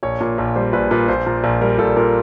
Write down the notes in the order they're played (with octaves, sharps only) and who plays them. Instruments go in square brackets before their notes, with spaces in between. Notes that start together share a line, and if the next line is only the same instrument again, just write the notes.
[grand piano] A#1 C#5
A#2
A#1
G3 C5
A#1 B4
A#2 B4
A#1 C5
A#2
A#1
G3 A#4
A#1 A4
A#2 A#4